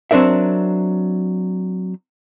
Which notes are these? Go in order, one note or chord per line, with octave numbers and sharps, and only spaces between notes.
F#3 C4 D4 A#4 E5